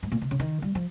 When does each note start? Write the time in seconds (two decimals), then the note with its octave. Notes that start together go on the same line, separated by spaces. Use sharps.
0.03 G#2
0.12 A#2
0.22 C3
0.31 C#3
0.40 D#3
0.62 G3
0.75 F3